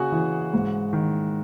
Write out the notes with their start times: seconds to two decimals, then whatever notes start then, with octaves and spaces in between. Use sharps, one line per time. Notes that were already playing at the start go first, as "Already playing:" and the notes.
Already playing: C#3 F#4 G#4 F#5 G#5
0.12 E3
0.54 G#2
0.93 D#3